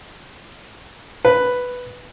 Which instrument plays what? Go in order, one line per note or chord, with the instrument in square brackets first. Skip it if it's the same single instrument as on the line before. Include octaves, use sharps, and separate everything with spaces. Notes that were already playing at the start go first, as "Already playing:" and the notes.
[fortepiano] B4